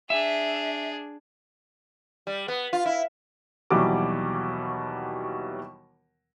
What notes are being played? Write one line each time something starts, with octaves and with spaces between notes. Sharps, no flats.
D4 G#4 E5
G3
B3
F4
E4
D#2 B2 E3 F#3 G3 D6